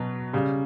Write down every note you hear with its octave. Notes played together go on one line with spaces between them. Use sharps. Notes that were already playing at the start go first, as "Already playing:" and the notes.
Already playing: B2 F#3
C#3 G3